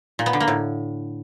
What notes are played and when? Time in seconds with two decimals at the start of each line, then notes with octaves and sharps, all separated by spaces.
0.19 A#2
0.26 B3
0.33 D3
0.40 A#3
0.48 A2